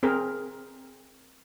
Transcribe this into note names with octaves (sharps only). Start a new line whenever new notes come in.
C4 G#4 A#4